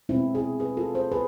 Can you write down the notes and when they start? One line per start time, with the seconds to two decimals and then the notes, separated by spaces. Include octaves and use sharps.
0.09 B2 G#3 C4 E4
0.35 E4 G#4
0.60 G#4 B4
0.77 F4 A4
0.95 A4 C5
1.12 G#4 B4